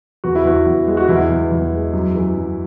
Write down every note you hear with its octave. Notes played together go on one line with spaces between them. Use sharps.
E2 F#4
E4
E2 F#4
E2
G#3
F#4
E2 E4
E2
E2
G#3
F#2
E3
F#2